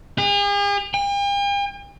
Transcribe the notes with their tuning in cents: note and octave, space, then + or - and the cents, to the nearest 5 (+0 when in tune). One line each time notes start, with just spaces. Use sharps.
G#4 -45
G5 +45